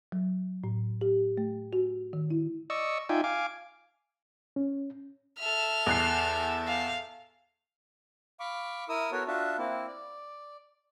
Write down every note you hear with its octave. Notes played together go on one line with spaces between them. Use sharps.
F#3
A2
G4
A3
F#4
D#3
E4
D5 D#5 C#6 E6
D#4 F4 D5 E5 G5 G#5
F5 G#5 D6
C#4
A4 E5 F6
E2 F#6 C7
F5
F5 B5 C#6 D6
E4 A#4 D#6 E6
B3 F#4 A4 A#4 C#5
D4 F4 F#4 E5 A5
A#3 C4 E4
D5